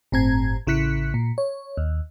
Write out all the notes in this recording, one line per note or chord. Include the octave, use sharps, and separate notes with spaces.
G1 A2 C4 A#5 G#6
A1 C#3 E4 F#6 B6 C#7
A#2
C#5
D#2